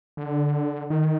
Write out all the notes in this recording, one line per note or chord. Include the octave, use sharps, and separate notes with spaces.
D3
D#3